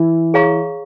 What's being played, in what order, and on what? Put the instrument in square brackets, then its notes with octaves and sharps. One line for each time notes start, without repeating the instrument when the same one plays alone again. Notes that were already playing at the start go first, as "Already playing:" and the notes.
Already playing: [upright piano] E3
[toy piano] G#4 C#5 F5 A#5 C#6